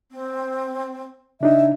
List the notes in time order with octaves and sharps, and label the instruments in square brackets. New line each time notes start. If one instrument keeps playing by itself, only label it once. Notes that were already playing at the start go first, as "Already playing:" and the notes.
[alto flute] C4
[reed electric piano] C#3 D4 D#4 [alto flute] E5